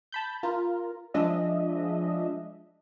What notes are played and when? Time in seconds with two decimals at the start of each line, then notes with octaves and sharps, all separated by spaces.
0.12 A5 B5 G6
0.43 F4 A#4
1.14 F3 G#3 D4 D#5 E5